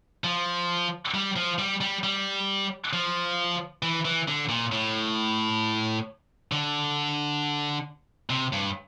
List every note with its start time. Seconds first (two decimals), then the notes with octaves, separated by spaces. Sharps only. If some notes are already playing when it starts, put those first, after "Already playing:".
0.24 F3
1.14 G3
1.36 F3
1.59 G3
1.81 G3
2.04 G3
2.93 F3
3.83 E3
4.05 E3
4.28 D3
4.49 A#2
4.72 A2
6.52 D3
8.30 C3
8.53 G2